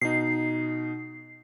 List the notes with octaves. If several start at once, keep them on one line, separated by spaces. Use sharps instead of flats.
B2 D#4 C7